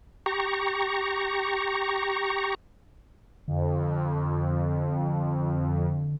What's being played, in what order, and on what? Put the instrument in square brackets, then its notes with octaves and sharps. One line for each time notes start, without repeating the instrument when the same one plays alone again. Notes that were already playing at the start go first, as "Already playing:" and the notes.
[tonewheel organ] G4 A#5 C#6
[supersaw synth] F2 [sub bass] D3